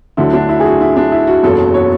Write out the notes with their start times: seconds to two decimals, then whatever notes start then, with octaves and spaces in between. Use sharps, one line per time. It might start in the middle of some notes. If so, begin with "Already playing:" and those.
0.17 D2 D3 F#3 E4
0.33 D4
0.49 E4
0.60 G#4
0.65 F#4
0.81 E4
0.97 D4
1.12 E4
1.27 F#4
1.43 F#1 E2 B2 F#3 A4
1.74 C#5